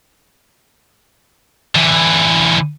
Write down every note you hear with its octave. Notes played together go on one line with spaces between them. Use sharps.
D3 E3